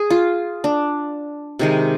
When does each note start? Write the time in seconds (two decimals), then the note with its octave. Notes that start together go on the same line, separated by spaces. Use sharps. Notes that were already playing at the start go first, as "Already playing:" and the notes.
Already playing: G#4
0.10 F4
0.64 D4
1.59 C3 D#3 G#3